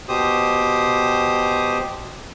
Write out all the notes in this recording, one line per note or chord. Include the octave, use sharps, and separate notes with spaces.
B2 G4 C5 D#6